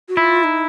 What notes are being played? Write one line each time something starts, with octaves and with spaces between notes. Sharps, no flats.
F#4
E4 F4
D#4